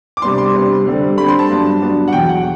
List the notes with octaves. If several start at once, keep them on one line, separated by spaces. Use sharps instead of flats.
D6
C3 G3 B3 D4 C6
C6
C3 G3 B3 D4
D3 G3 C4
D3 G3 C4 B5
C6
A5
G2 F#3 B3 D4
G2 F#3 B3 D4
F#5
E2 B2 F#3 G5
F#5